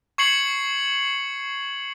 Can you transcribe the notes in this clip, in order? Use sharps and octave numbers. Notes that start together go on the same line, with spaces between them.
C#6 G#6 C7 C#7 F#7